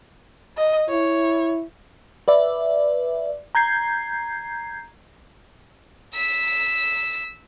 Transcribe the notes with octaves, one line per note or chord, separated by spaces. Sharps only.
D#5
E4 C#5
B4 D5 E5
A#5 G6 G#6 C7
E6 B6